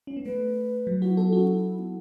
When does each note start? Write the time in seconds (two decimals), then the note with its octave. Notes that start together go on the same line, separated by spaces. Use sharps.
0.07 C#4
0.17 B3
0.26 A3 B4
0.87 F#3
1.02 E4 F#4
1.17 B3 A4
1.33 C#4 F#4
1.47 E4
1.79 B3